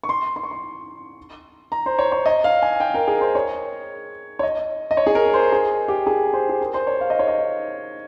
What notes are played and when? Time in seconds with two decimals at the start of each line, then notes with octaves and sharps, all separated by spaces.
0.04 C#6
0.09 C6
0.36 C6
0.43 C#6
0.51 C6
1.72 A#5
1.86 C5
1.99 C#5
2.12 C#5
2.26 D#5
2.44 F5
2.62 G#5
2.80 G5
2.94 A#4
3.08 G#4
3.21 C5
3.35 C#5
4.39 C#5
4.43 D#5
4.91 D#5
4.97 C#5
5.07 G#4
5.15 A#4
5.34 C5
5.52 G#4
5.88 G4
6.07 G#4
6.33 C5
6.49 G#4
6.61 A#4
6.74 C5
6.87 C#5
7.01 F5
7.10 D#5
7.19 C#5
7.28 D#5